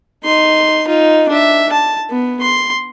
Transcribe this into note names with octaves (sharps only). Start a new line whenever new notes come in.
D#4 C6
D#4 F4
D4 E5
A5
B3
C6